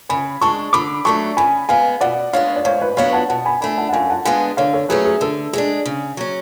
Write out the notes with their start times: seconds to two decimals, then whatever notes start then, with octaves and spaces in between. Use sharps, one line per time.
0.09 C#3 G#5 B5
0.41 G#3 D4 A5 C#6
0.73 D3 B5 D6
1.05 F#3 A3 D4 A5 C#6
1.37 C#3 G#5 B5
1.69 G#3 B3 F5 G#5
2.01 B2 D5 F#5
2.33 G#3 B3 D4 C#5 F5
2.56 D5
2.65 G#2 C#5 F5
2.82 B4 D5
2.97 F#3 B3 D4 C#5 F5
3.13 F#5 A5
3.29 B2 F#5 A5
3.45 G#5 B5
3.61 A3 D4 G#5 B5
3.78 F#5 A5
3.89 F#5
3.93 F#2 F5 G#5
4.10 F#5 A5
4.25 D3 G#3 B3 D4 F5 G#5
4.57 D3 C#5 F5
4.73 A4 C#5
4.89 F#3 A3 C#4 G#4 B4
5.05 G#4
5.21 D3 A4
5.53 G#3 B3 D4 G#4
5.85 C#3
6.17 F#3 C#4